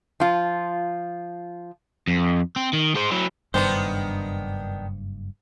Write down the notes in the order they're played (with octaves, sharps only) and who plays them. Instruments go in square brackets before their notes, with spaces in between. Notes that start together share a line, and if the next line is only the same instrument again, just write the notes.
[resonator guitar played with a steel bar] F3 F4
[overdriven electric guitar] F2
C4
D#3
G#3 C5
F#3 E4
[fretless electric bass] F#1 G2 [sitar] D#3 B3 D4 [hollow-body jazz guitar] C5